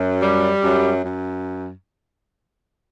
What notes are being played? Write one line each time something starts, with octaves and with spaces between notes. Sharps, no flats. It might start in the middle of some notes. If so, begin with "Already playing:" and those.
Already playing: F#2
G3
F#2
F#2